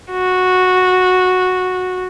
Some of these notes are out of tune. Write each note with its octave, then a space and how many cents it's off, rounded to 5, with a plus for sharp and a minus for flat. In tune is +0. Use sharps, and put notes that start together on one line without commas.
F#4 -10